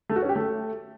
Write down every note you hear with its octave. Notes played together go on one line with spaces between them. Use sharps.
A3
F#4
C#4
G4
A3